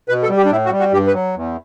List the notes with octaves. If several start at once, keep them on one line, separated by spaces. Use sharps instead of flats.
B2 B4
A4
G3
G4
D4
A2 E4
F#4
G3
F#4
G2 G4
B4
F#3
E2